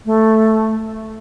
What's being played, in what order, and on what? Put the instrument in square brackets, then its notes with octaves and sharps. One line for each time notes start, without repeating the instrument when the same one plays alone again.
[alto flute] A3